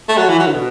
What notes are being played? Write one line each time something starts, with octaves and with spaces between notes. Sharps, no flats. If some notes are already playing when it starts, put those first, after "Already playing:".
A3
F#3
E3
F#3
D3
B2